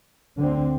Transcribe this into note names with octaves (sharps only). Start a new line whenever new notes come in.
D2 D3 C4